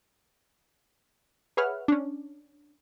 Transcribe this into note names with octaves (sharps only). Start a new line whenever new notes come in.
G#4 B4 C#5 E5 F#5 F6
C#4 D4